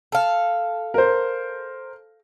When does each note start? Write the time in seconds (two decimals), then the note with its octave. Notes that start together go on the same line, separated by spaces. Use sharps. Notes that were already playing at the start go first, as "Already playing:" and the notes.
0.12 A4 F5
0.94 A#4 C5